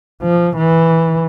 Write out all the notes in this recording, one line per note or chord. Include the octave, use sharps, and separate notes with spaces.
F3
E3